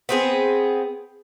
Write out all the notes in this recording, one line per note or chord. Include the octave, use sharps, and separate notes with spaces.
B3 C4 G#4